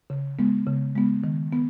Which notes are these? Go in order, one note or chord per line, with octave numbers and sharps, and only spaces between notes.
C#3
G#3 B3
C#3
G#3 B3
D#3
B3